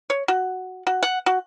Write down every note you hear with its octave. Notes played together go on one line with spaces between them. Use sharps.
C#5
F#4
F#4
F#5
F#4